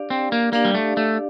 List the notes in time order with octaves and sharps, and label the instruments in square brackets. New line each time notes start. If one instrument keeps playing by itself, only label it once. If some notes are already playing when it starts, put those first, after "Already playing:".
Already playing: [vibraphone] D4 G4 D5 F5
[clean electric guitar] C4
A#3
[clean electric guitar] A#3 [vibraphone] D4 G4 D5 F5
[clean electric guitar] G3
A3
A3